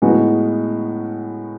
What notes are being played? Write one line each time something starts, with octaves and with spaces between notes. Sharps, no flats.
A2 G#3 B3 D#4 F#4